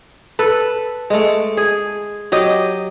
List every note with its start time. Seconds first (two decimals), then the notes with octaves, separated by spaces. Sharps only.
0.39 A4 B4
1.10 G#3 A3
1.57 G#4
2.32 F#3 G4 D#5